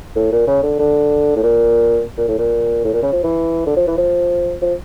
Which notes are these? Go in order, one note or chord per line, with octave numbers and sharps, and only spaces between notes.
A2
A#2
C#3
D3
D3
A2
A#2
A#2
A2
A#2
A2
A#2
C#3
F3
E3
D3
F3
E3
F3
F3